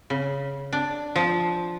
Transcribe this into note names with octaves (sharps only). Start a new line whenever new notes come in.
C#3
D4
F3